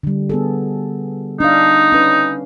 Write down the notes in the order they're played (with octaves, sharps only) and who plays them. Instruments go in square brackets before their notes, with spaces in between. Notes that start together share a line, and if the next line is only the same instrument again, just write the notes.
[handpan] D3 G3
B3 G#4 A4
[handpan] D4 F5 [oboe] D#4
[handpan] C#4 B4